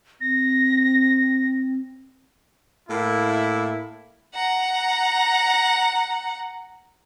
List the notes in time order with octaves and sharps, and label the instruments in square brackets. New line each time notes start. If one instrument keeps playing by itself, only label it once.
[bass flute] C4 [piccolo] A#6
[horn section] A2 A#3 E4
[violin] F#5 A#5